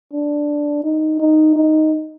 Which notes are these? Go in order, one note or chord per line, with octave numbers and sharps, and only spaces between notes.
D4
D#4
D#4
D#4